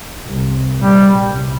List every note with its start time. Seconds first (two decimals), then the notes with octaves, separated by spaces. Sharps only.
0.26 C2 C3
0.77 A#1 A#2 G3
1.27 C2 C3